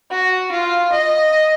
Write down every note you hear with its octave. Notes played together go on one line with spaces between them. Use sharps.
F#4
F4
D#5